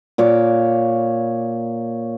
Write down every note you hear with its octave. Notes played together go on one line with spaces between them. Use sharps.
A#2 C#5 D6